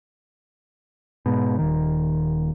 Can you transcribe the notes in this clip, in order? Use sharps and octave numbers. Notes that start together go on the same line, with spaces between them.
G#2 B2
D#1 D#3